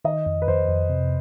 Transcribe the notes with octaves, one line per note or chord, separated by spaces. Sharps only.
D#3 D#5
F2
B4
F2 C5
F2
C3